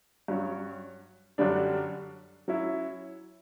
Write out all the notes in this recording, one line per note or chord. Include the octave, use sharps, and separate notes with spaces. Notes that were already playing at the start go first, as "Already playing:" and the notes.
G2 F#3 C#4 F#4
F#2 D3 G3 D4
F#3 C#4 E4